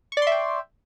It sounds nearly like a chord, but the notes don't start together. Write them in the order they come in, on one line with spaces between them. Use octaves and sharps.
C#6 D5 C6 E5 G5